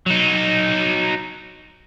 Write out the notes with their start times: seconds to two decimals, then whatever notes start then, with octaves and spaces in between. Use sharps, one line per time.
0.06 F#3 D#4